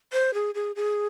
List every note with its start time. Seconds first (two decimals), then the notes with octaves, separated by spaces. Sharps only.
0.13 C5
0.34 G#4
0.55 G#4
0.76 G#4